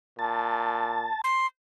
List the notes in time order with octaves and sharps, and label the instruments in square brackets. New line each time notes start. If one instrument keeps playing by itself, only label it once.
[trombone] A#2 [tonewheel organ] A5
[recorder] C6